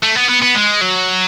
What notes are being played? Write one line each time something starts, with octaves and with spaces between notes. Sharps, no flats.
A3
B3
B3
B3
G#3
F#3